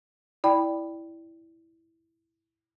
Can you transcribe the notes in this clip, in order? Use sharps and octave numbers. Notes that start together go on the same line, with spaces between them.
E4 D5 G5 B5